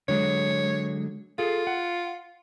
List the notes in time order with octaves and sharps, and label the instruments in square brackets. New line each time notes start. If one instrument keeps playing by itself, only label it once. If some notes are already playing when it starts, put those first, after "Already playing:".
[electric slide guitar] D3 F#3 G#3 [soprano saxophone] C#5
[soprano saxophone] F4 [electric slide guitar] G#4 A4
[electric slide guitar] F#5